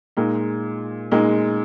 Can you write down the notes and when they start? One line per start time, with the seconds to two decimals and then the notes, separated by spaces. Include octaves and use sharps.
0.17 A#2 G#3 D#4
1.12 A#2 G#3 D#4